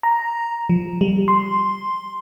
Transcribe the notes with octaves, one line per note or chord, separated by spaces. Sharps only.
A#5
F3
G3
C6